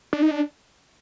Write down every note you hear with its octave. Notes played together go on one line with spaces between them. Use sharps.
D4
D#4
D4